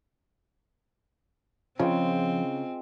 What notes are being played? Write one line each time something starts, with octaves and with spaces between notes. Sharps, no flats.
C#3 F3 G#3 C4 F4 G5